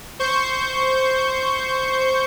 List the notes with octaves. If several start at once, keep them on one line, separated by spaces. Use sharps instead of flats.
C5 C#6 G6